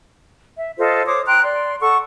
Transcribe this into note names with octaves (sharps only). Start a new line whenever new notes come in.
E5
F4 A4 C5 D#5
C5 C#5 D6 D#6
G5 A#5 C6 F#6
D5 C6
A4 F#5 C#6